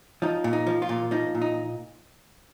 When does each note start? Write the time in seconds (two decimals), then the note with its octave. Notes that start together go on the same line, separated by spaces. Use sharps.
0.22 F3 D#4
0.44 A#2
0.53 D#4
0.67 F3
0.82 F4
0.89 A#2
1.11 F3 D#4
1.35 A#2
1.42 D#4